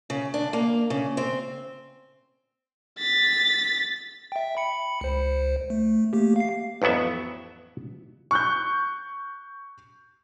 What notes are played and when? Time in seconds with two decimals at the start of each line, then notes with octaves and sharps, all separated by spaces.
0.10 C#3
0.34 D4
0.53 A#3
0.90 C#3
1.17 C4
2.98 A6 B6
4.32 E5 G5
4.57 B5 C#7
5.01 C#2 C5
5.70 A3
6.13 A3 A#3 G4
6.36 F5 C7
6.82 A1 F2 F#3 B3 E5
8.31 C#6 F#6 G6